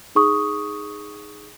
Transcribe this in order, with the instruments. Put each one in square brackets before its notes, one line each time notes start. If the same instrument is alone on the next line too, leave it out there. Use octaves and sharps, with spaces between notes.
[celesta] D#4 G#4 C#6 D#6